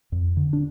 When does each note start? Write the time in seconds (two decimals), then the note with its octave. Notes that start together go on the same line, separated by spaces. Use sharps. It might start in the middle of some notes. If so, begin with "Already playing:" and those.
0.12 F2
0.37 D3
0.53 D4